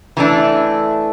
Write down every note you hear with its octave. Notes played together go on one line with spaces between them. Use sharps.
E3 A3 D4